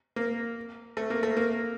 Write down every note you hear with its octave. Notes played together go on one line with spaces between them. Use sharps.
A#3
A3
A#3
A3
A#3